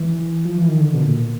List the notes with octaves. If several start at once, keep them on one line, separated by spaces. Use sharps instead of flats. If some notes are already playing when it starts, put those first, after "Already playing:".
Already playing: E3
F3
E3
D#3
D3
B2
A#2